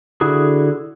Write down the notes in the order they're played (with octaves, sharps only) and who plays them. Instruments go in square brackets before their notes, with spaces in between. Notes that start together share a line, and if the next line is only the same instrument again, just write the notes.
[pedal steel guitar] D3 E4 F#4 G#4